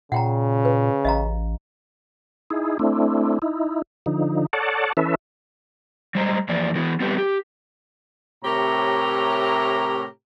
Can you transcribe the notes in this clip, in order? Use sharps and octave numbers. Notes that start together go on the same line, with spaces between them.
A#2 C#3 F#5 G5 A#5
B4
A1 D#5 F5 A#5
D#4 E4 G#4
A3 C4 D4 E4
D#4 E4
D3 F3 D#4
A4 C#5 D5 F#5 A5
E3 C#4 A4 B4 E5
G3 G#3 C5 D#5 A#5
F2 E3 A#3 D5
E3 B3 E4 F#4
G3 B3 C4 G4 B4
G4
A2 C3 G4 A#4 C#5 A#5